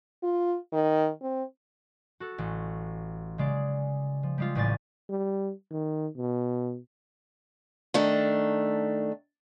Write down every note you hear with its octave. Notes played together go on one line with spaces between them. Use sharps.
F4
D#3
C4
F#4 A4
A1
C#3 G#3 D5
F3
G3 G#3 F4
A1 A2 G3 F4 G#5 A6
G3
D#3
B2
D#3 A3 D4